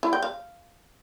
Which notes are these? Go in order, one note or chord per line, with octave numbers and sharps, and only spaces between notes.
E4
G5
F5